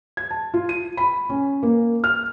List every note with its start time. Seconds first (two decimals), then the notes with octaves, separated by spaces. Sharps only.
0.17 G#6
0.31 A5
0.54 F4
0.69 D#7
0.97 B5
1.29 C#4
1.63 A#3
2.04 F6